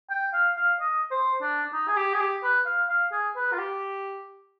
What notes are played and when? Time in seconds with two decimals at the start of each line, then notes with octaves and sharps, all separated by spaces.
0.10 G5
0.34 F5
0.57 F5
0.81 D#5
1.11 C5
1.42 D4
1.73 D#4
1.88 G#4
1.97 G4
2.14 G#4
2.20 G4
2.43 B4
2.66 F5
2.89 F5
3.12 G#4
3.36 B4
3.53 F4
3.59 G4